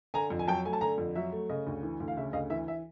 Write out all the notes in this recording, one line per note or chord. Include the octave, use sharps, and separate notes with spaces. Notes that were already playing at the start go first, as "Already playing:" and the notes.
D3 G#5 A#5
F2
G#5
F#3 G5 A5
A3 G#5
A5
D3 G#5 A#5
F2
F#3 E5
A3
C#3 D#5
D2
E3
D2
F5
C#3 E5
D2 D#5 F5
E3 E5
E5